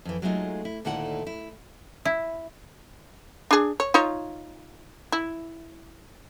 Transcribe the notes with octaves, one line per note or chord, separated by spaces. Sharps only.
F2 E3
F#3 G#3 A3 C#4 D#4 F4
E4
D2 A#2 D#3 E4 A4 F#5
E4
E4
D4 G#4
C#5
D#4 F4 C#5
E4